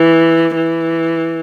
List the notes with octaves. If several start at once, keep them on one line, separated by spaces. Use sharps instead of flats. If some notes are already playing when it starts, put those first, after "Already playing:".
Already playing: E3
E3